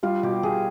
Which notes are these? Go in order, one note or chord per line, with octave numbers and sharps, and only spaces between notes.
G3 F4
B2 G4
B2 G#4